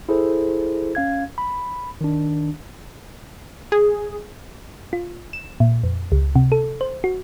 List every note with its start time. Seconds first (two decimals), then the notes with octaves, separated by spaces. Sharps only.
0.09 E4 G#4 A4 C5
0.95 C#4 F5 G#6
1.38 B5
2.01 D#3 D4
3.72 G#4
4.93 F4
5.33 E7
5.60 A#2
5.83 F2
6.12 C#2
6.35 C3
6.52 A4
6.81 C5
7.04 F#4